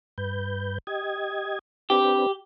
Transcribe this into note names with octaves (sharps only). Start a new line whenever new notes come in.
G2 B4 G6
G4 D#5 G#6
C4 D4 G4 B4